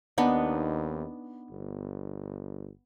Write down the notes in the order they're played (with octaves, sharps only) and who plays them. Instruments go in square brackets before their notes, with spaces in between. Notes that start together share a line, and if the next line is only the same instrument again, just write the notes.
[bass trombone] D#2 [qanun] B3 D4 D#4
[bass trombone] G1